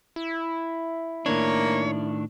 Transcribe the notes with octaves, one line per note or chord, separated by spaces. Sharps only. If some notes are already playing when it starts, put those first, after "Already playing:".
E4
A2 D#3 A#3 D4 C#5